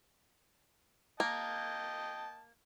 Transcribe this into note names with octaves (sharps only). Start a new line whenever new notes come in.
A#3 D#5 G5 A5